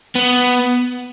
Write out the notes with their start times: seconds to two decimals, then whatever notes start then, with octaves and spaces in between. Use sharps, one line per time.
0.16 B3